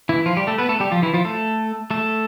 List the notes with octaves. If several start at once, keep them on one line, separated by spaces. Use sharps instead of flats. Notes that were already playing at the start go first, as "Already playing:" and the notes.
E3 E4
F3 F4
G3 G4
A3 A4
B3 B4
A3 A4
G3 G4
F3 F4
E3 E4
F3 F4
A3 A4
A3 A4